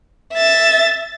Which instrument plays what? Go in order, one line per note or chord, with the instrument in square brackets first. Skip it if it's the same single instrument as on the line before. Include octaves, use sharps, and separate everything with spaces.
[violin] E5 A6